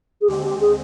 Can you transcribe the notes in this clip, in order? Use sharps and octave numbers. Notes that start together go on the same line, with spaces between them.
G#4
D#2 D3 G#3 C4 G4
G4
G#4